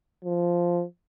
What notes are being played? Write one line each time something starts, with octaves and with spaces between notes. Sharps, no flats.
F3